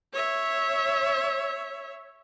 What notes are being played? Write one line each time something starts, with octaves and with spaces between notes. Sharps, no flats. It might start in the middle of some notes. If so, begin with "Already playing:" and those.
C#5 E5